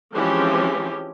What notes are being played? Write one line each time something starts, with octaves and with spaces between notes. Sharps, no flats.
E3 F3 G#3 C4 C#4 G4